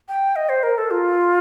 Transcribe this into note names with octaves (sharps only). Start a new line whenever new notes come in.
G5
D#5
C5
A#4
A4
F4